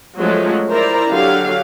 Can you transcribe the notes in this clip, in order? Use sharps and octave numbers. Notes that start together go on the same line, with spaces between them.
F3 F#3 G#3 A3 C#4
E4 A#4 C5 D5 A#5
D3 F#3 G4 F5